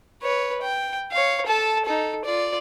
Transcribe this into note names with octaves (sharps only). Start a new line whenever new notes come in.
B4 C#5
G5
C#5 F5
A4 A5
D#4 A4
F4 D5